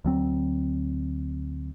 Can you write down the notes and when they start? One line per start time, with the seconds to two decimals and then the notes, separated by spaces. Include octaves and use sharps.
0.05 D2 F#3 C4